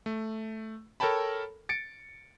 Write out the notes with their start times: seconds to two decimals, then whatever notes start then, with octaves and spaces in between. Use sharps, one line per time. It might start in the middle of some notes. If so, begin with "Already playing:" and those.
0.06 A3
1.00 A4 A#4 C#5 G5 A5 B5
1.69 A6 C#7 D7